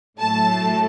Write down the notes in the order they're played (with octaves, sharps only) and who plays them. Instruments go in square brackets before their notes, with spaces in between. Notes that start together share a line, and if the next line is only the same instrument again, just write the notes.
[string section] A2 F#3 A3 A5